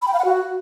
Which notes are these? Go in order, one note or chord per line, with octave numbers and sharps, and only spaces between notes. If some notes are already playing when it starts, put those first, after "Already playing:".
B5
G5
F5
F#5
F#4